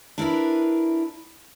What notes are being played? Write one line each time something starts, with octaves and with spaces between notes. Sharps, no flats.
D4 E4 A#4 B4